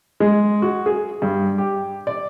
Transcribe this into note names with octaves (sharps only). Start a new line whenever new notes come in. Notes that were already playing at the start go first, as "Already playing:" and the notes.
G#3
F#4
G#4
G2
G4
D5